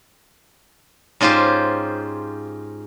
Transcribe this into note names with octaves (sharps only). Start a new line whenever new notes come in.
G#2 C#4 F4 G4 C5